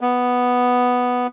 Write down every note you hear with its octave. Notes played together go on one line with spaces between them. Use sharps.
B3